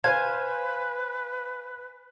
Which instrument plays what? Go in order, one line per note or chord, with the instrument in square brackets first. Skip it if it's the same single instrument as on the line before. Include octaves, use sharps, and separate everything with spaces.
[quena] B4 [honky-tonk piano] C5 [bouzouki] F5 F#5 G#5 [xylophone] G#6